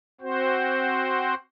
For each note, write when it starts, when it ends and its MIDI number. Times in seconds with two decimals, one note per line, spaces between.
0.21 1.34 60
0.21 1.34 66
0.21 1.34 72